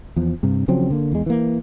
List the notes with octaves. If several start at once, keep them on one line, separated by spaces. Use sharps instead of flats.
E2 F3
G2 C3
C#3 F3 F#3 C4
D3 A#3
E2 G#3
E3 A#3